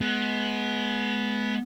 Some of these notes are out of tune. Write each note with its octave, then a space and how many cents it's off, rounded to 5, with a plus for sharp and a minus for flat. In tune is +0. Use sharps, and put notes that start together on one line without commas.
G#3 +30 B3 +0